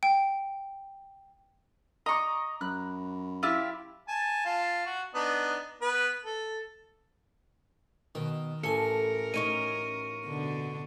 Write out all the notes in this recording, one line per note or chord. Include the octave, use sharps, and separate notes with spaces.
G5
D#5 A#5 C#6 D6
F#2 B5 F#6
E4 F4 G4 E6
G#5 A5
F4 A5
F#4
B3 D4 D#4
B3 B4
A4
B2 D#3
A1 A4 A#4 G#5 C#7
C#4 D#4 C#5 C#6 C#7 D#7
B2 D3 D4